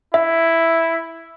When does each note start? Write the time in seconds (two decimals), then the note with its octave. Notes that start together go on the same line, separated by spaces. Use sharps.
0.14 E4 E5